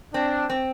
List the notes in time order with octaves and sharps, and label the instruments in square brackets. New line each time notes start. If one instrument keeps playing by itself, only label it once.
[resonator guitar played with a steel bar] C4 [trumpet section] D4
[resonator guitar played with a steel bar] C4